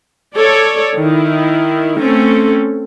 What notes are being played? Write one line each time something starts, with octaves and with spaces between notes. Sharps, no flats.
A4 C#5 D5
D#3 E4
A3 C4 C#4 A4